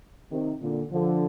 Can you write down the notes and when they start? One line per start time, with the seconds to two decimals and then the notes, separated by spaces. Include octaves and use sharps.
0.32 C3 D#3
0.61 A#2 D3
0.91 D3 F3